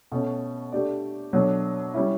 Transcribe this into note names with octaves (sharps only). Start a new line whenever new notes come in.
B2 A3 C#4
A3 D4 G4 D5
B2 F#3 A3 D4
G3 C#4 E4